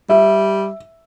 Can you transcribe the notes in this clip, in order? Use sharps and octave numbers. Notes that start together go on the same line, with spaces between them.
G3 E5